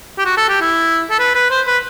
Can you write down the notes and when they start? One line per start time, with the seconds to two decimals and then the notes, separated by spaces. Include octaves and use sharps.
0.18 G4
0.25 F#4
0.37 A4
0.49 G4
0.61 E4
1.11 A4
1.20 B4
1.35 B4
1.51 C5
1.67 B4